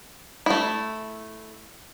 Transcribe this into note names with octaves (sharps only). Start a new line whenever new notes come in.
A3 E4